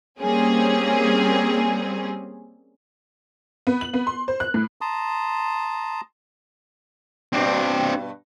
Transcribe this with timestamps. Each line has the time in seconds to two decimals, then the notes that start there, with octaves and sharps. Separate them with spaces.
0.20 G3 A#3 C4 C#4 G#4
3.67 B3
3.81 F#7
3.94 B3
4.07 C6
4.28 C5
4.40 F#6
4.54 A2
4.81 A5 A#5 C6 D#6
7.33 G2 B2 C4 D4